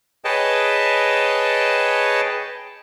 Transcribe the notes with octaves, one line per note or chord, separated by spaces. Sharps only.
G#4 B4 C#5 D#5 G5 A5